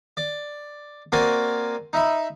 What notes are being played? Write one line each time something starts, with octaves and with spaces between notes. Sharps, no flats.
D5
A#3 C4 F#4 A#4 D5 G#5
D#4 E5 B5